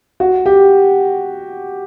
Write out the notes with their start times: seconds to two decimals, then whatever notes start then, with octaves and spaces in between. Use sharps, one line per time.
0.20 F#4
0.46 G4